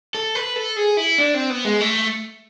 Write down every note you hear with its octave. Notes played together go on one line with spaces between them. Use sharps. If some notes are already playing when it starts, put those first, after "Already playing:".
A4
B4
A4
G#4
E4
D4
C4
B3
G#3
A3